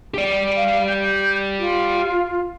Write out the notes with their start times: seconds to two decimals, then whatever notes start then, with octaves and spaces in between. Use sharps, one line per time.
0.14 G4 D5
0.56 F5
0.88 G6
1.59 F4